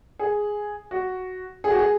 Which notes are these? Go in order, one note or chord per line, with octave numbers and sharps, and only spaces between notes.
G#4
F#4
G#4
F#4
G#4